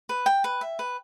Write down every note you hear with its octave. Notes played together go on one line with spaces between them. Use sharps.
B4
G5
B4
E5
B4